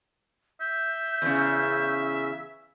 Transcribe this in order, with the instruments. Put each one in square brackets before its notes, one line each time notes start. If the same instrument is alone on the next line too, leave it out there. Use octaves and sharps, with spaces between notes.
[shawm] E5 [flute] G6
[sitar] E2 C#3